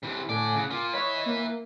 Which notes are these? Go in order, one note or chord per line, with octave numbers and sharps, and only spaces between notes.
C3 E3
A2 D3 A3 D5 G#5
C#3 F#5
A#3 F4 D6
B4 C#5 D#5 E5
A#3